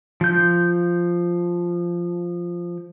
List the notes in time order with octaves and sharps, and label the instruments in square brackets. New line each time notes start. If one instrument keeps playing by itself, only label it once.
[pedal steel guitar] F3 G6